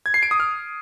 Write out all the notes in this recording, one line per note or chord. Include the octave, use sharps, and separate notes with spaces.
G#6
C7
D7
D#6
F6